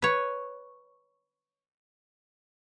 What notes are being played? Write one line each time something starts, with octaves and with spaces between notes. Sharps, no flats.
B4 C#5